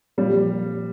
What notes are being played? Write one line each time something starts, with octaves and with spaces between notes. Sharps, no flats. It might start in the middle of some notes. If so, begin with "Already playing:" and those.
A#2 F3 G3